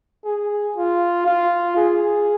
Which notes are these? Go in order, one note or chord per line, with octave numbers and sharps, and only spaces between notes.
G#4
F4
F4
G#4